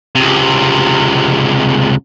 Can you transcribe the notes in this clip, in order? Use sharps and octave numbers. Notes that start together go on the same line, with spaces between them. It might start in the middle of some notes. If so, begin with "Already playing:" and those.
C#2 C3